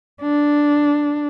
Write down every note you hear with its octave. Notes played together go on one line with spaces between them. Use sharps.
D4